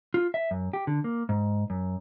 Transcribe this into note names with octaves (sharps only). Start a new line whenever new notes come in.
F4
E5
F#2
G4
D3
A#3
G#2
F#2